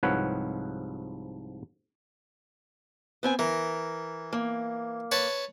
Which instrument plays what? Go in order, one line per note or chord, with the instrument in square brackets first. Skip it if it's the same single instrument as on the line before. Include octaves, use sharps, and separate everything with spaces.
[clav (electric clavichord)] C2 G#2 F3 B4 C#5 F#5
[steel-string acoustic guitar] B3 C4 G#5
[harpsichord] E3 [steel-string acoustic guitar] A#4
[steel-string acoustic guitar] A#3
[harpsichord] B4 C#5 A5